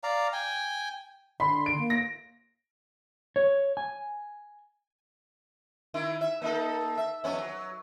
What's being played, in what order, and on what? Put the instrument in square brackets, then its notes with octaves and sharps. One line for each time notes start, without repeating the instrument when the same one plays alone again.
[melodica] D5 F5 A#5
G5 G#5
[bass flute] D3 [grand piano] B5 [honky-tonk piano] C6
[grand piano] D7
[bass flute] A#3
[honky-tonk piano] A#6
[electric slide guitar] C#5
G#5
[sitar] D#3 E4
E5
A#3 D#4 A4
E5
F2 B3 C#4
F#3